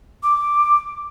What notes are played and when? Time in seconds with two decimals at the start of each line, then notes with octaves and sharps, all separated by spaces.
0.23 D6